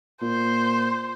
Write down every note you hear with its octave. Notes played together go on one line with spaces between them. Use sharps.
A#2 C5